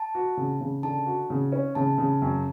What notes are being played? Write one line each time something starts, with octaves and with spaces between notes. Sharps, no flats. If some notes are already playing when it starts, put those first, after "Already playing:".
Already playing: A5
F#4
C#3
C#3
D3 A5
F#4
C#3
C#4
C#3 A5
C#3
F#2